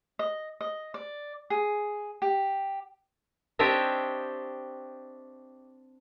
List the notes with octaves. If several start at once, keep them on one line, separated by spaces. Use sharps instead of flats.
D#5
D#5
D5
G#4
G4
C4 D4 G4 C#5 D#5 E5